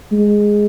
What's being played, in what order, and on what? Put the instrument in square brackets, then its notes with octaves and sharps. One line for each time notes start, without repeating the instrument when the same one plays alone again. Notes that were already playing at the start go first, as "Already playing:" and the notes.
[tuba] G#3